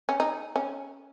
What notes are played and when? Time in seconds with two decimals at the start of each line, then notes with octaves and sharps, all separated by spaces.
0.09 C#4
0.20 D#4
0.56 C#4